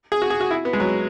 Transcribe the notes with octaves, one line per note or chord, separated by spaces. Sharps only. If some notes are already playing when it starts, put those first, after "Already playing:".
G#4
F#4
G#4
F#4
E4
B3
G#3
F#3